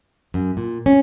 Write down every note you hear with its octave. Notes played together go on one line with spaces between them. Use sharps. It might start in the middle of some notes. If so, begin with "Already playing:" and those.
F#2
A#2
C#4